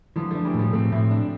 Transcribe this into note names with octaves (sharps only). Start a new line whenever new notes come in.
D3 E3 F3
F3 A3 D4
E3 G3
A2
F3 A3
A2 A3 C4
A2 C4 E4
D4